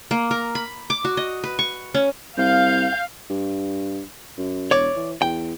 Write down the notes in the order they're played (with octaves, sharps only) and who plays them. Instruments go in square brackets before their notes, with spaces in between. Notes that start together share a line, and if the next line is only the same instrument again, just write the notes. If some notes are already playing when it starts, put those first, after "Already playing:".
[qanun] A#3
A#4
B5
D6
F#4
D#5
B4
C#6
C#4
[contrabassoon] C2 [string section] F5 [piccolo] G6
[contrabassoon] G2
F#2
[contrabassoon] E1 [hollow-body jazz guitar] C#5 D5
[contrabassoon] E3
[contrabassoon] E2 [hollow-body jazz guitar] G5